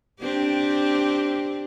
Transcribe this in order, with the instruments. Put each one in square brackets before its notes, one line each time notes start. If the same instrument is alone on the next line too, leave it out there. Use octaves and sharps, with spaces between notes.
[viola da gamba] C4 D4 G4